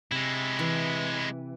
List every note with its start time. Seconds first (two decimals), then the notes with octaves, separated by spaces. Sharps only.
0.12 C3 G#3 E4
0.59 E3